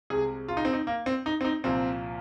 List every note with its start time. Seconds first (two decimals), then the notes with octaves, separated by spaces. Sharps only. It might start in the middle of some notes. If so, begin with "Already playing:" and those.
0.10 C2 C3 G#3 G#4
0.48 F4
0.57 D#4
0.65 C4
0.73 D#4
0.87 A#3
1.06 C4
1.26 D#4
1.41 C4
1.45 D#4
1.64 C2 A#2 F3 C4